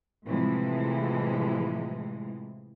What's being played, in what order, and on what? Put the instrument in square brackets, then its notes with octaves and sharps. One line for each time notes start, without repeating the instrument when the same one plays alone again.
[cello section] A2 C3 E3 F3 G#3